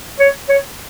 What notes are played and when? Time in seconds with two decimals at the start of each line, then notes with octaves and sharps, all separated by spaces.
0.20 C#5
0.49 C#5